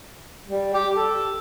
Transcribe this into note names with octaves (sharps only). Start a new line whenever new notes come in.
G3
G4
A4